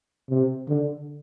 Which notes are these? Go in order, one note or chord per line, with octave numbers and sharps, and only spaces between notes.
C3
D3